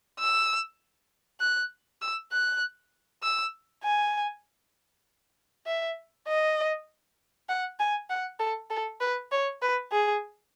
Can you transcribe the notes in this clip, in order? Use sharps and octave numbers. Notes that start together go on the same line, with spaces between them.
E6
F#6
E6
F#6
E6
G#5
E5
D#5
F#5
G#5
F#5
A4
A4
B4
C#5
B4
G#4